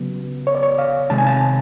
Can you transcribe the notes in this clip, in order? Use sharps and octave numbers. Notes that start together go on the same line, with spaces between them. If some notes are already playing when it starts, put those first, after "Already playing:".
Already playing: C#3 F#3 B3
C#5
D5
C#5
F5
C3 D#3 G#3 C4 A5
G#5
A5